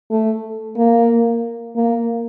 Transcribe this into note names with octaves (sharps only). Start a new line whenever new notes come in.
A3
A#3
A#3